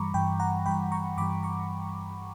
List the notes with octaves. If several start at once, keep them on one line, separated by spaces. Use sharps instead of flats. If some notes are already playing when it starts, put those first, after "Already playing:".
Already playing: G2 E3 G3 A#5 B5 C#6 D6
G2 E3 G3 G5 B5
F#5 A#5
G2 E3 G3 G5 B5
A#5 C#6
G2 E3 G3 B5 D6
A#5 C#6